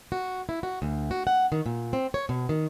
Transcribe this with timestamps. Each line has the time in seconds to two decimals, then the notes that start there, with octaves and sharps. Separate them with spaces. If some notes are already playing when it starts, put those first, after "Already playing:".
0.12 F#4
0.49 E4
0.63 F#4
0.82 D2
1.11 F#4
1.27 F#5
1.52 D#3
1.66 A#2
1.93 C4
2.14 C#5
2.29 B2
2.49 D#3